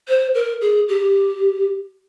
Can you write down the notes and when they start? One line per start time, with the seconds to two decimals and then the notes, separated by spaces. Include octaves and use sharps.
0.08 C5
0.35 A#4
0.61 G#4
0.88 G4